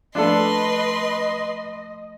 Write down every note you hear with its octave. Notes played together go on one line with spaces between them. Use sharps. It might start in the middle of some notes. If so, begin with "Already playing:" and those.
F3 A3 D4 A4 B4 D#5 C6